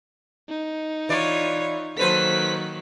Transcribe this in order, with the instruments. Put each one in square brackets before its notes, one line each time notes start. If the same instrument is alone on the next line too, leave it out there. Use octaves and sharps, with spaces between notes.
[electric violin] D#4
[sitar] E3 D5 [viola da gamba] F4 C#5
[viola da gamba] D#3 F#3 A#3 [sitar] A4 B4 C5 [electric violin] B6